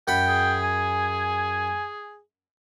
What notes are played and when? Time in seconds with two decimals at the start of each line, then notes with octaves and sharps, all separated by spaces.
0.08 F#2 F#5 G5 B5
0.28 G#4
0.63 G#5